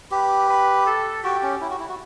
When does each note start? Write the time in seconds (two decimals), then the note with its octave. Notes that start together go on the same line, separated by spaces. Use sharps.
0.11 G4 B4
0.49 B4
0.86 A4
1.24 F#4 G4
1.43 C#4
1.61 E4
1.70 F#4
1.79 E4
1.89 F#4